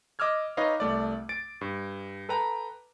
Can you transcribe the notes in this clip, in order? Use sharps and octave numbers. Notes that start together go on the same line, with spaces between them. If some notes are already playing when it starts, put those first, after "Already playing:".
D#5 D6 E6 F6 G#6
D#4 B4 C#5 D#5 F5
C2 A3 D5
A6 D7
G2
A4 B4 G5 A#5